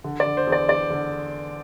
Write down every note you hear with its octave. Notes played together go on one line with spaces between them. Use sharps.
D3
D5
D3
C5
E2
D5
E2 D5
D3